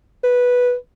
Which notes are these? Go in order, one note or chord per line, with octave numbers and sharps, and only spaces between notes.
B4